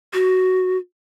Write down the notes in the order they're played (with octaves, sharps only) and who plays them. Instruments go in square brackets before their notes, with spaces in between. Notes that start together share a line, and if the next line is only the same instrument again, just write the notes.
[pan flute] F#4